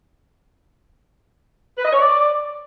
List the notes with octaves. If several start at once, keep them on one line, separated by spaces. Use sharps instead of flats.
B4
D#5
C#5
D5